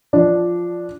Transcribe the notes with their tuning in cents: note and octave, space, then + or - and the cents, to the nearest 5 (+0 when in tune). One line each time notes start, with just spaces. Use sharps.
F3 +0 D4 +0